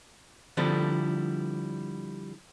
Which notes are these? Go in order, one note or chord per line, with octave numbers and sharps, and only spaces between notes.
D3 F3 G3 C4 E4 A4